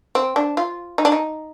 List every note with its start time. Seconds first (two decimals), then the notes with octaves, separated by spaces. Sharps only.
0.15 C4
0.36 D4
0.57 F4
0.98 D#4
1.05 D4
1.12 D#4